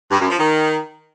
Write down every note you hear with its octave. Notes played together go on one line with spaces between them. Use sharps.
G2
F#2
F3
D#3